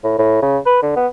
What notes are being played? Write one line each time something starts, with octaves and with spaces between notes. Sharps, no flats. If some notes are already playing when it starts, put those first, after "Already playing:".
A2
A2
C#3
B4
D3
B3